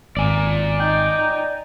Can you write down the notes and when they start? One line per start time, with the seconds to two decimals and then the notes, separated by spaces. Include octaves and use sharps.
0.17 G#1 D5 G#5
0.80 D#4 G5